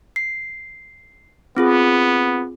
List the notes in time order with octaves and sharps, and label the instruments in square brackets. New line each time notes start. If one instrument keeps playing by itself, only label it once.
[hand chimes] C7
[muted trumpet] B3 [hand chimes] C4 F4 G#4